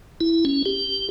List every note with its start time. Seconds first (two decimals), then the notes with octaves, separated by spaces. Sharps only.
0.21 E4
0.45 C#4
0.66 G4